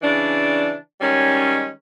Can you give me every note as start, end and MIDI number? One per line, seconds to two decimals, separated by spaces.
0.02 0.75 49
0.02 0.75 52
0.02 0.75 62
1.01 1.69 51
1.01 1.69 55
1.01 1.69 56
1.01 1.69 61